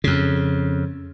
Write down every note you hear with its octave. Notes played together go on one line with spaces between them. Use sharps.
F2 C#3